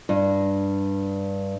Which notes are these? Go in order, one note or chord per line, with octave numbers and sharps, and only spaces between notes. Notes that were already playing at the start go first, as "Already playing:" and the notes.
G2